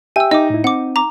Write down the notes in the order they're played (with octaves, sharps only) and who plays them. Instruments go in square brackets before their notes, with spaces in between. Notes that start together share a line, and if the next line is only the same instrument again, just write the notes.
[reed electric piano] G4 E5 G5 [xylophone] G#5 E6
[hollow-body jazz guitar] D#4 [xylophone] D#5 D6
[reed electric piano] A2 E4
[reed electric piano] C4 [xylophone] F#5 D6
[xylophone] A#5 D6